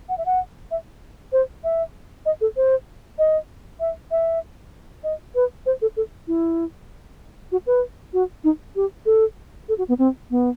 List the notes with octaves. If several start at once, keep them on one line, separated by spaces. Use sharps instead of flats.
F#5
E5
F#5
E5
C5
E5
D#5
A4
C5
D#5
E5
E5
D#5
B4
C5
A4
A4
E4
F#4
B4
F#4
D#4
G4
A4
A4
F#4
B3
C4
B3